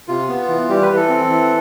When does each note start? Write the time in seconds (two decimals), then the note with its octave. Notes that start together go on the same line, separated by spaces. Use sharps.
0.08 C3 F4
0.29 B3
0.48 E3
0.69 G3 G4
0.82 B4
0.90 E3
0.96 A4
1.09 C4
1.29 E3